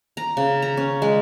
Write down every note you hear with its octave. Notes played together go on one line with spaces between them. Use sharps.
A#5
C#3
A#5
C#4
G#3